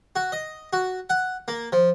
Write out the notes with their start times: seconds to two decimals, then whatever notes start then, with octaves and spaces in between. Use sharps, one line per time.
0.16 F#4
0.32 D#5
0.73 F#4
1.10 F#5
1.48 A#3
1.72 F3